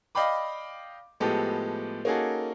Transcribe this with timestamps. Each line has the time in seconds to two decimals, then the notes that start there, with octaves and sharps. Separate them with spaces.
0.15 D5 D#5 F5 G5 B5 D6
1.20 A2 F3 G#3 B3 G4 A4
2.05 A#3 C#4 D#4 F#4 G#4 A4